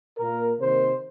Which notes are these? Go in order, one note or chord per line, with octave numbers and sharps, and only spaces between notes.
A#2 A#3 A#4
C3 D#3 A#3 C5